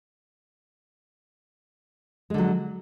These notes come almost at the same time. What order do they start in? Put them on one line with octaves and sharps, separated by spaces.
G#3 D3 F#3